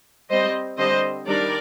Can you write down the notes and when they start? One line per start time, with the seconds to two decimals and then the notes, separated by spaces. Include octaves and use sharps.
0.30 G3 C4 C5 D#5
0.78 D3 G3 C4 C5 D#5
1.26 D#3 G3 D4 A#4 D5